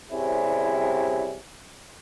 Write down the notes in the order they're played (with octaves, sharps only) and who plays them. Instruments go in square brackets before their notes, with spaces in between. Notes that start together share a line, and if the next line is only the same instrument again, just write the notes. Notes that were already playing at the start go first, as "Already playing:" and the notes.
[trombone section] C2 C3 G3 C#4 E4 G#4